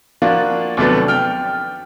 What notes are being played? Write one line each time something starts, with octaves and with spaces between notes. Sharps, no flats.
F3 A#3 D4 F4 F#4
D#2 C3 F#3 A3 B3 D4
G5 F6